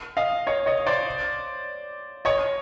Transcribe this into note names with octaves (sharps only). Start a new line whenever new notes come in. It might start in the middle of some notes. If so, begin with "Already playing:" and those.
D#5 F5
C#5 D#5
C#5 D#5
C5 D5
C#5 D#5